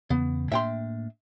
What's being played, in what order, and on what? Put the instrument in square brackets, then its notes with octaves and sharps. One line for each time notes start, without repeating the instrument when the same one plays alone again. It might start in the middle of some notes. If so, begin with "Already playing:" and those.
[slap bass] E2 C#3 [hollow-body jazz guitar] B3
[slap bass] A2 A#3 D4 [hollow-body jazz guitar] E5 G5 C6